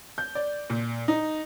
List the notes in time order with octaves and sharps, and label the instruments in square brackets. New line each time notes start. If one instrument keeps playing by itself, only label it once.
[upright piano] G6
D5
A#2
D#4